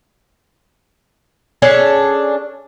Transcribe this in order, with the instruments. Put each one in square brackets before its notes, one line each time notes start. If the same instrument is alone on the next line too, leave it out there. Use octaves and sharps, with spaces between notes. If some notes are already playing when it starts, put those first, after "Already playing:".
[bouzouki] C#4 D4 G#4 A4